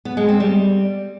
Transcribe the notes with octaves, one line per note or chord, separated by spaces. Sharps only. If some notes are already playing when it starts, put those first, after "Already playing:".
B3
G#3
C4
G3